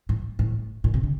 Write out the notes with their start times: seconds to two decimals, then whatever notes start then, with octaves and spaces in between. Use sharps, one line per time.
0.09 A2
0.39 A2
0.84 A#2
0.94 C3
1.03 D3